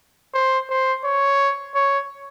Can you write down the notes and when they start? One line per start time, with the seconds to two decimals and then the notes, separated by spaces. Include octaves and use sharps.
0.34 C5
0.70 C5
1.04 C#5
1.75 C#5